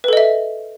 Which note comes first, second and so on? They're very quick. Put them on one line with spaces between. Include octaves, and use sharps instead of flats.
B4 A4 D#5 E5